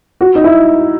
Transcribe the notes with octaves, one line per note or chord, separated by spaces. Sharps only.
F#4
D#4
E4